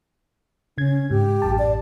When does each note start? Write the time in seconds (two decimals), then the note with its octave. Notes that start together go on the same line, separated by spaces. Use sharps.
0.78 C#3 C#4 G#6
1.11 G#2 G4
1.42 A1 F#2 A5
1.59 D5